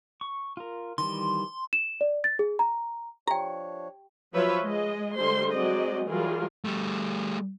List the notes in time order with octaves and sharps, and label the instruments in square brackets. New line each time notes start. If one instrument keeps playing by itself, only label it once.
[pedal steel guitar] C#6
F4 A#4
[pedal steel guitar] D#3 E3 G3 [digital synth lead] C6
[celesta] E7
D5
A6
G#4
A#5
[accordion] F3 D4 C#5 [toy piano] G4 G5 [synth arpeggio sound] A#5
[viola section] F3 F#3 F4 B4 C#5 E5
G#3 D#5
D3 G3 G#3 C5 C6
F#3 G#3 C4 F#4 D5 D#5
E3 F#3 G3 F4 G#4 A#4
[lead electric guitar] G3 A3